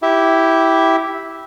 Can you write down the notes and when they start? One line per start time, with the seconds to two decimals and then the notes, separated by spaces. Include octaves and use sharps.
0.02 E4 G4 E5